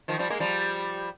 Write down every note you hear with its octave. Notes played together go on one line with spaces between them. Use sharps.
D#3 F3
F3 G3
G#3 A#3
F3 G3